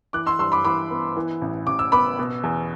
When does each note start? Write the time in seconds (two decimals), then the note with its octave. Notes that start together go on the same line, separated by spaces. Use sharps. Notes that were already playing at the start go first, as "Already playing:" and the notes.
0.13 E3 D6 F#6
0.26 C6 E6
0.39 G2 C6 E6
0.52 B5 D6
0.65 E3 B5 D6
0.90 B3
1.17 E3
1.42 A1
1.67 A1 D6
1.79 E6
1.92 B3 B5 D6
2.19 B2
2.43 E2